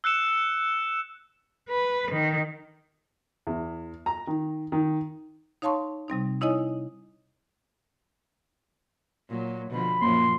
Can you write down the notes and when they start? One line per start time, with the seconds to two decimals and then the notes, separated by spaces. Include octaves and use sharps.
0.04 E6 F#6 C#7 E7
1.70 B4
2.11 D#3
3.47 E2
4.06 A#5
4.27 D#3
4.72 D#3
5.62 D#4 C#5 F5 A5 C6 C#6
6.08 C3 G3 C4 D#4
6.41 D#4 E4 C#5 D#5 G#5 D#6
9.29 A#2 F#3
9.71 B2 D3 F3 B5
10.02 F#2 A#2 F3 A#3 C6